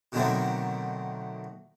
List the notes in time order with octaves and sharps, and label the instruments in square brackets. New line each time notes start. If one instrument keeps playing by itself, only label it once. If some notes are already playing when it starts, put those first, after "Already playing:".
[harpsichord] B2 D3 D#3 F#3 A3 C4